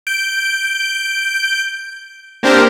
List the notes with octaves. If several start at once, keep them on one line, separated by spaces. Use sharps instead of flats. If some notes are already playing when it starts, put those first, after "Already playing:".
G6 D7
A#3 C4 D4 G4 A#4 C5